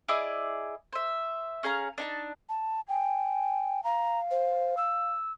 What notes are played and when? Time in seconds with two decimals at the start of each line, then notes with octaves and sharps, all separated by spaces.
0.08 E4 G#4 D5 D#5
0.93 C5 E5
1.63 C#4 G#4 F5 A#5
1.98 D4 D#4 A5
2.49 A5
2.89 G5 G#5
3.84 F5 A#5
4.31 C5
4.77 E6